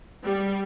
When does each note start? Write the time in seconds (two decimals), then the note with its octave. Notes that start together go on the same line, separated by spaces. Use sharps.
0.23 G3